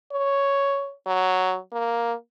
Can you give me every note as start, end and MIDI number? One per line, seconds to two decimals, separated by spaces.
0.12 0.93 73
1.06 1.58 54
1.72 2.13 58